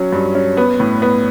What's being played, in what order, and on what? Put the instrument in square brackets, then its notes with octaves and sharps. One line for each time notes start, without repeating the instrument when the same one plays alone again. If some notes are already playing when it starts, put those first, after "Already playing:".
Already playing: [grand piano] F#3 C#4
G2
C#4
B3
A2
B3